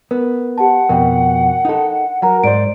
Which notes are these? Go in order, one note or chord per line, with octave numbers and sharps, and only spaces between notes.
B3 A#4
G4 F#5 A5
F2 B2 A#4 G5
D#4 A4
F#3 A#4 F#5 A#5
G#2 C5 D5 D7